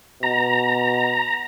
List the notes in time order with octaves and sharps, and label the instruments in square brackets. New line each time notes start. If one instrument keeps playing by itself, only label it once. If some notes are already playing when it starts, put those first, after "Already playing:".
[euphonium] B2 [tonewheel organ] A#5